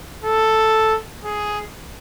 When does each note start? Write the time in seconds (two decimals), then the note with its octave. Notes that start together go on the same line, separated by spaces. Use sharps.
0.24 A4
1.24 G#4